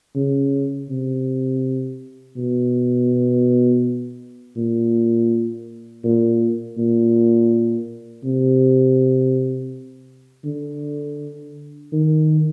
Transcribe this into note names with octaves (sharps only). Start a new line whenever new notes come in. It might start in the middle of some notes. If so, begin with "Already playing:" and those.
C#3
C3
B2
A#2
A#2
A#2
C3
D3
D#3